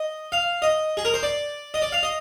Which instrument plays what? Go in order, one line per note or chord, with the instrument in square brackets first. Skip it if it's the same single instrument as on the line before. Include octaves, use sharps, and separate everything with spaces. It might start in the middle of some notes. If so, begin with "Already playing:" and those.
Already playing: [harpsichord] D#5
F5
D#5
G#4
A#4
C5
D5
D#5
D5
F5
D#5